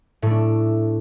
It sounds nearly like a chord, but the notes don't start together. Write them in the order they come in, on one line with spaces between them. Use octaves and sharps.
A2 A3 D4